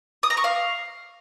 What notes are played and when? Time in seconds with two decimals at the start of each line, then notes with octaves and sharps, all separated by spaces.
0.23 D#6
0.30 A#5
0.37 C#6
0.44 F5